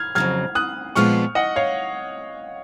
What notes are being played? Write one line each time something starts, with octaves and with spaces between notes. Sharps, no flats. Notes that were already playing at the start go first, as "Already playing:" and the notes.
Already playing: F6 G#6
F2 C#3 F#3 F6 G#6
D#6 F#6
A#2 F3 G#3 B3 F4 C#6 F6
D#5 F#5
C#5 F5